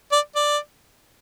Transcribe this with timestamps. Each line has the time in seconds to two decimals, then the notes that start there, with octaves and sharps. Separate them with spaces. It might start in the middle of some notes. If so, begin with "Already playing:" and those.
0.12 D5
0.36 D5